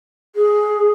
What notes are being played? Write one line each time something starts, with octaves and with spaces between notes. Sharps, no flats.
G#4